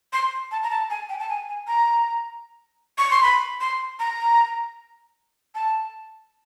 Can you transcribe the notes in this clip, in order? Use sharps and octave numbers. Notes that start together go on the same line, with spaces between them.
C6
A5
A#5
A5
G#5
G5
A5
G#5
G#5
A#5
C#6
C6
B5
C6
A#5
A5